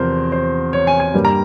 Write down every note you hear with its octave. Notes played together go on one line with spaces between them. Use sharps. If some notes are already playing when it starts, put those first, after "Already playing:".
Already playing: E2 C3 F3 C4 A#4 C5
C5
C#5
G#5
G#5
G2 G3 A#3
A#5